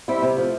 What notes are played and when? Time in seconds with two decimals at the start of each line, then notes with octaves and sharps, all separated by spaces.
0.08 G3 C4 E4
0.23 C3
0.37 F3 A3